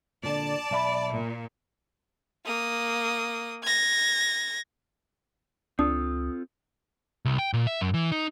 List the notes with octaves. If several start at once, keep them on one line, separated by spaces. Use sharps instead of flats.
A#2 D3 D5 A5
B1 E5 B5
A#2
A#3 D#6
G#6 A#6
C#2 C4 D4 F4 A4 D#6
C2
G5
A#2
E5
F#2
E3
D#4